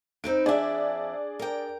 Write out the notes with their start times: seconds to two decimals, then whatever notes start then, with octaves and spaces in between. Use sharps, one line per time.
0.24 C4 D#4 B4 D7
0.46 F2 D4 G#4 D5 E5
1.39 A#4 G5